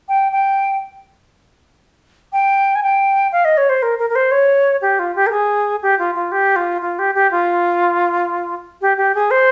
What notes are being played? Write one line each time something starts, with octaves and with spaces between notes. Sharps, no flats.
G5
G5
G5
G#5
G5
F5
D#5
C#5
C5
A#4
A#4
A#4
C5
C#5
G4
F4
G4
A#4
G#4
G4
F4
F4
G4
F4
F4
G4
G4
F4
G4
G4
G#4
C5